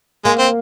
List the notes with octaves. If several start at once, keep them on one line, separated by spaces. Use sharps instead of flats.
G#3 A#3
C4